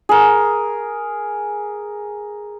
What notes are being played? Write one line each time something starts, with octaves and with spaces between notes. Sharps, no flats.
G#4 A#4